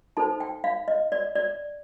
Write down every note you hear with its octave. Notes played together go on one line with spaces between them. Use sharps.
D#4 A4 C5 A5
G5
F5
D#5
D5
D5